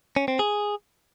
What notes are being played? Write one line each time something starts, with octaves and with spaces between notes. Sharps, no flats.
C#4
C4
G#4